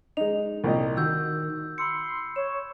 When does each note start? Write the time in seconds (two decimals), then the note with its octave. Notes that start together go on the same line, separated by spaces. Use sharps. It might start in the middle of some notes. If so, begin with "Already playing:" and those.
0.17 G#3 D#4 F7
0.64 C2 A#2 D#5
0.97 D#3 F#4 E6 G6
1.78 B5 C6 E6 C#7
2.36 C#5 E7